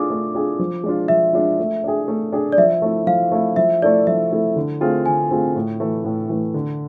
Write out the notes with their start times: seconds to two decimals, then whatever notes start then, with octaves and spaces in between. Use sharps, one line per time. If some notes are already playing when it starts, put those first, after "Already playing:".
Already playing: A3 D4 F4 G#4 D6
0.10 A3
0.35 D4 F4 G#4
0.59 F3
0.84 G#3 D4 F4
1.08 F3 E5
1.33 G#3 D4 F4
1.59 A3
1.84 D4 G#4
2.08 A3
2.32 D4 G#4
2.52 D5
2.58 F3 E5
2.82 A3 E4
3.07 F3 F5
3.32 A3 E4
3.56 F3 E5
3.82 A3 E4 A4 D5
4.07 F3 E5
4.32 A3 E4 A4
4.56 D3
4.81 A3 C4 F4 G#4
5.06 D3 G#5
5.31 A3 C4 F4 G#4
5.56 A2
5.80 E3 A3
6.04 A2
6.29 E3 A3
6.54 D3